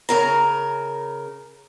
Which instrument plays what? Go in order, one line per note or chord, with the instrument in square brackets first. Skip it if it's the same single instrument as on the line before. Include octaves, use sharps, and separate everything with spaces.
[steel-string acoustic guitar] C#3 A#4 A#5